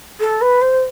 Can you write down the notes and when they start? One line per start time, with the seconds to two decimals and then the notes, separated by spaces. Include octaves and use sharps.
0.20 A4
0.41 B4
0.62 C5